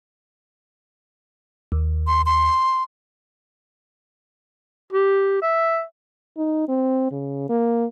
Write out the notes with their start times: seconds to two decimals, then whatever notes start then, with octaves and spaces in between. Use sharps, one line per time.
1.72 D#2
2.07 C6
2.26 C6
4.93 G4
5.42 E5
6.37 D#4
6.68 C4
7.11 C#3
7.49 A#3